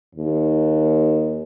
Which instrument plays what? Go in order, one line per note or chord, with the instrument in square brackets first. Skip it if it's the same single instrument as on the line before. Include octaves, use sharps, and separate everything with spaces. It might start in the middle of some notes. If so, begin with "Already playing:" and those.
[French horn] D#2